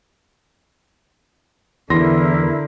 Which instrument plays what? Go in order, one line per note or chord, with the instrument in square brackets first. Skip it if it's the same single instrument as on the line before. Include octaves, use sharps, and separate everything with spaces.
[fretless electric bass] E2 [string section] D3 [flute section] E4 A#4 [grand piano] C6 A#6